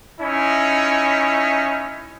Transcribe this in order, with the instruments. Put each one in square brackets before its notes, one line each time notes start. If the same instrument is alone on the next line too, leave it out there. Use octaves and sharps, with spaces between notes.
[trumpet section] C#4 D#4 E4